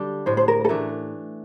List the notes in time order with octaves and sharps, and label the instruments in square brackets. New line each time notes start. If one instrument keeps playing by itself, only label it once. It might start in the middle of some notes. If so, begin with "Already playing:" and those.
Already playing: [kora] D3 G3 D4 G4
[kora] A2 [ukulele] C5
[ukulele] C5
A#4
A4
[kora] E3 A3 D4 [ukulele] A#4